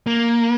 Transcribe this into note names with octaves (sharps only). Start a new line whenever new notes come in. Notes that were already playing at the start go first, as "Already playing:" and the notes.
A#3